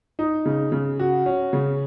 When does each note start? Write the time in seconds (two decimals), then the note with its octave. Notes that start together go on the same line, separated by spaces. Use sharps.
0.19 D#4
0.45 C#3
0.72 C#3
1.00 F#4
1.26 C#4
1.53 C#3